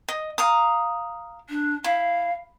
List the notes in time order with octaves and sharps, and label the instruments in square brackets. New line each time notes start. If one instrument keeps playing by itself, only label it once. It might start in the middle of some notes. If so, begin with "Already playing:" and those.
[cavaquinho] D#5
F5 A#5 D#6
[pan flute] D4
[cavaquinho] E4 [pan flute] F5